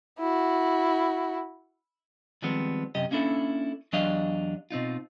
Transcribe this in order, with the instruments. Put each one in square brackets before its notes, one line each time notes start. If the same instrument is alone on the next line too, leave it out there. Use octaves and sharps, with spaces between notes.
[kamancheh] E4 F#4
[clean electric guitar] D#3 F3 G3 G#3 B3 C4
F#2 C3 G4 D#5
A#3 C#4 D4 E4 A4
E2 F#3 D4 G4 D#5 F5
B2 C4 D#4 F4